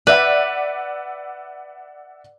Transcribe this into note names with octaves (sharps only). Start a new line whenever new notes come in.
B4 D5 E5 F#5